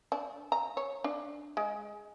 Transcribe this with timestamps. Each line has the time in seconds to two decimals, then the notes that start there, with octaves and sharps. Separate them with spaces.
0.12 D4
0.52 A#5
0.77 C#5
1.04 D4
1.57 G#3